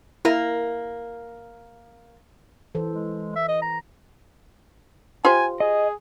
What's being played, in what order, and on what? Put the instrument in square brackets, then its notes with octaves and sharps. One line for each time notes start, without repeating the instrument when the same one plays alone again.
[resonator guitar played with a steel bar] A#3 [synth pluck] E4 A#4 E5
[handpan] E3 A4 C5
[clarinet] G#3
E5
D#5
A#5
[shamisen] F4 G4 C5 [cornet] G#5
[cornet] G#4 [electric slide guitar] D#5